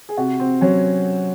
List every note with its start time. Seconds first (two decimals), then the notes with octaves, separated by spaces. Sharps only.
0.09 G#4
0.18 C3 F#4
0.40 C4
0.61 F#3 C#4